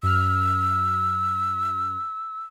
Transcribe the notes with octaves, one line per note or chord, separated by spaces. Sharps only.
F#2 E6 F6